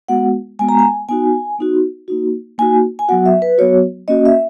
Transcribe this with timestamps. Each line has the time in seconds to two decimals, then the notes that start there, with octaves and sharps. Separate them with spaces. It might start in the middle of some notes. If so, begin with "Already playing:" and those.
0.09 G#3 B3 F#4 F#5
0.59 G#3 B3 F#4 G#5
0.69 A#5
0.79 G#5
1.09 B3 D#4 F#4 G#5
1.58 B3 D#4 F#4
2.08 A#3 D#4 F#4
2.58 A#3 D#4 F#4 G#5
2.99 G#5
3.08 F#3 B3 F#4 F#5
3.26 E5
3.42 B4
3.58 F#3 B3 F#4 C#5
4.08 A#3 C#4 F#4 D#5
4.25 E5